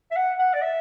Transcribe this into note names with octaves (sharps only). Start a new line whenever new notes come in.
E5
F#5
F#5
D5
E5